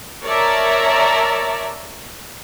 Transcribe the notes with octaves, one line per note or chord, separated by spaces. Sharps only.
A#4 C#5 D5 E5 A5 A#5